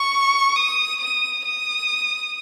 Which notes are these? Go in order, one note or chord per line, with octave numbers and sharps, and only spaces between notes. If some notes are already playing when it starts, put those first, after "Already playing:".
Already playing: C#6
D#6
D#6
D#6